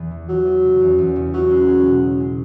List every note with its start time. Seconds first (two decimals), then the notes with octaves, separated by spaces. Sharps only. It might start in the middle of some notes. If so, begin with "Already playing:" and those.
Already playing: E2 B3
0.11 E3
0.29 E3 F#3
0.46 B3
0.64 C#3
0.81 E2
0.98 E2
1.16 C#3
1.34 F#3 C#4
1.51 G#3
1.68 G#4
1.86 B2
2.03 C#4
2.20 G#3